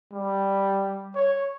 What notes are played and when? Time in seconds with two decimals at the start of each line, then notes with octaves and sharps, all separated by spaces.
0.12 G3
1.15 C#5